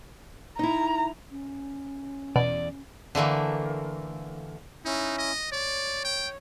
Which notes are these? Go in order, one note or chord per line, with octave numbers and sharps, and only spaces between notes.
D#4 E4 A#5
C#4
E2 B2 D5
D3 E3 A3 A#3
C#4 D#4 E4
D#5
C#5 D5
G5